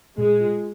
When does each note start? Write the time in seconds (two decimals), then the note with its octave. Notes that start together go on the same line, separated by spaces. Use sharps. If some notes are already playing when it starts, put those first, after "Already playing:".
0.18 A#2 G#3
0.41 F4